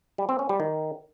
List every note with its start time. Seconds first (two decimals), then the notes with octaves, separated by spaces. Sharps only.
0.18 G3
0.29 C4
0.39 C#4
0.49 G3
0.60 D#3